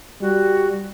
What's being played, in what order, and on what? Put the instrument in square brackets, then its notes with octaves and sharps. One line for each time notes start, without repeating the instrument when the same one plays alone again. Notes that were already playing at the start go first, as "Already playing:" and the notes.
[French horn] G3 [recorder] F#4